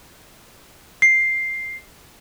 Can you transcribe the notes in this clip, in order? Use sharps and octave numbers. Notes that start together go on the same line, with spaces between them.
C7